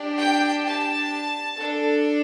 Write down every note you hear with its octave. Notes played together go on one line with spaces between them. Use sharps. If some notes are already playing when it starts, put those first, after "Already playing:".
Already playing: D4 G4
G5
A5
D4 A4